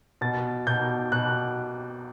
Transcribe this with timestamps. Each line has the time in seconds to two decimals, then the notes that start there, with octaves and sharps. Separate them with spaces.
0.21 B2 A6
0.67 B2 G6
1.12 B2 F#6